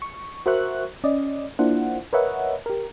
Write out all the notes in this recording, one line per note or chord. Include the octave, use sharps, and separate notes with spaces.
C#6
F#4 A#4 C5 E5 C#6 F#6
C#4 D5 D#5
A#3 D4 E4 F4 C5 F#5
A#4 B4 C#5 D#5 E5 F#5
G4 A#4